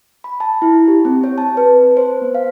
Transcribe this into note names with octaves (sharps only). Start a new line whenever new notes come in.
B5
A5
E4
G4
C4
C#5
A5
B4
C5
B3
F5